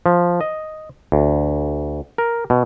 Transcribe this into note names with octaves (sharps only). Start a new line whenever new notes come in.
F3
D#5
D2
A#4
B2